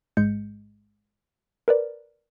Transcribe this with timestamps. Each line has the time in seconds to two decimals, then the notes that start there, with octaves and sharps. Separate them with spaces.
0.17 A1 G#2 G#3 D#5 G6 C#7
1.68 A#4 B4 D5